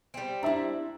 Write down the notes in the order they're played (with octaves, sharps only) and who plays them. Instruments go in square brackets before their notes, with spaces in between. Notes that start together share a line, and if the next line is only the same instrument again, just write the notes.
[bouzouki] G3 C4
[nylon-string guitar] D4 E4 [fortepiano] E5 A#5